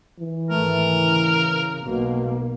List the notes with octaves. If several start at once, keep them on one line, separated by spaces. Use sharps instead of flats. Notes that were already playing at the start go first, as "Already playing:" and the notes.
E3
G#1 A3 A#4
C#3
B1 B2 A#3